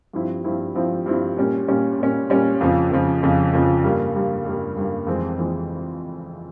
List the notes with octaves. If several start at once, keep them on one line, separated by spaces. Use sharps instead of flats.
G2 F3 C4 E4
G2 F3 C4 E4
G2 F3 C4 E4
G2 F3 C4 E4
A#2 G3 C#4
A#2 G3 C#4
A#2 G3 C#4
A#2 G3 C#4
F2 C#3 F3
F2 C#3 F3
F2 C#3 F3
F2 C#3 F3
G2 G3 A#3
G2 G3 A#3
G2 G3 A#3
G2 G3 A#3
F2 E3 G#3 C4
F2 E3 G#3 C4